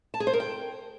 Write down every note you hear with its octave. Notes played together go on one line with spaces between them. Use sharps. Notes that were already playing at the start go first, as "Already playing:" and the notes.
A5
G#4
C5
A#4
G5